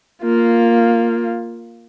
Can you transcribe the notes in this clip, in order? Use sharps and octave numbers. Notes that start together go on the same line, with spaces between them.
A#3 F4